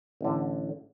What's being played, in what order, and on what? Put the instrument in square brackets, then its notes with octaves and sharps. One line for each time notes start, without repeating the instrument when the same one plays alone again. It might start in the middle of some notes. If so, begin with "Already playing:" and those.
[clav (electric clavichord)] A1 D3